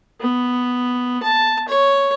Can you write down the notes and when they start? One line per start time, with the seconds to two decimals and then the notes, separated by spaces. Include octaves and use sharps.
0.21 B3
1.23 A5
1.68 C#5